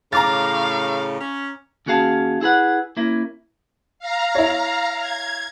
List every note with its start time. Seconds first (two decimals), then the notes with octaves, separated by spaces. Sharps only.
0.13 A2 C#3 F5 A#5 D6 A6
1.20 C#4
1.86 D#2 C#4 F#4 G#4 F5 A5
2.41 E4 G#4 B4 F#5
2.97 A#3 C#4 E4
3.99 F5 A#5
4.35 E4 C#5
5.01 G#6